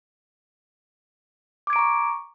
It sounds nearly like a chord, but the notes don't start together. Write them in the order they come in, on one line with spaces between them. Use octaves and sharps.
D6 G#6 D7 A#5 C#6